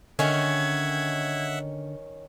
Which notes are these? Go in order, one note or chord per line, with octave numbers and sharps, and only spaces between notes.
D3 D#3 C#4 E5 F#5 G#6